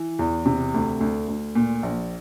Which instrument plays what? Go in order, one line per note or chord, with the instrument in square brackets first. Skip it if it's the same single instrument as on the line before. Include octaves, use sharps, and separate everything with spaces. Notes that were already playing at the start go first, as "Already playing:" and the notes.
Already playing: [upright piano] E3
E2
C3
D2
D2
D2
A#2
A#1